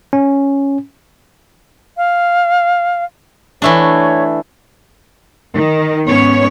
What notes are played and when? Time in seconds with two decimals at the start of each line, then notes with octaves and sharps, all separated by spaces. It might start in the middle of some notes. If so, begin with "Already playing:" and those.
0.13 C#4
1.97 F5
3.62 E3 A3 D4 C#5
5.54 D#3
6.07 G#2 B3 C#4 C#5